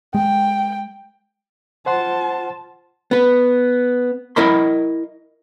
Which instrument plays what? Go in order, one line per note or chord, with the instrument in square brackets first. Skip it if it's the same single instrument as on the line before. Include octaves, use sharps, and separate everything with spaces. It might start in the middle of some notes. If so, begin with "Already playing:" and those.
[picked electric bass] G#3 [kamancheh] G5
[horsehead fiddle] F4 A5 [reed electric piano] C5 F#5 C6
[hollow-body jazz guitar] B3 B4
E4 A#4 D#5 B5 C6